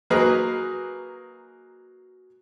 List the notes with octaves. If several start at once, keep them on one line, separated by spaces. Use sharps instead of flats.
F#3 A#3 D#4 G#4 B4